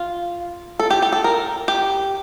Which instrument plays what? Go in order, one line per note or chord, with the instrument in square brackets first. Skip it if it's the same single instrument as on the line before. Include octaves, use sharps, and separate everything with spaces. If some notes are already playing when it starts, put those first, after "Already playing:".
Already playing: [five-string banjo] F4
A4
G4
G4
A4
A#4
G4